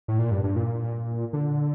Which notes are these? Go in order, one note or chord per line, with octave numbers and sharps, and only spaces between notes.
A2
A#2
G2
G2
A#2
D3